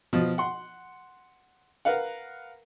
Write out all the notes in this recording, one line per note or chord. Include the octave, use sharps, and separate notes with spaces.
B2 F3
F#5 C6
A#4 B4 F5 F#5